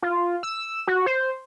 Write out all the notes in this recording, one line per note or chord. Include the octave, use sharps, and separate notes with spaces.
F4
E6
F#4
C5